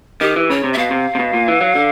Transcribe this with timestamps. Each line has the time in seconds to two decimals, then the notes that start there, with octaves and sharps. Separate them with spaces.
0.21 D#3 G4
0.36 E3
0.50 C#3 C#5
0.64 C3
0.73 E5
0.77 B2 F5
0.91 C3
1.15 C3
1.19 B2
1.33 A#2
1.48 E3
1.61 F#3
1.75 D3